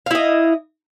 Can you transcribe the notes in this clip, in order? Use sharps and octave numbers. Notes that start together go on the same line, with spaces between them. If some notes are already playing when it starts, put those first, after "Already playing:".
E4 D#5 F5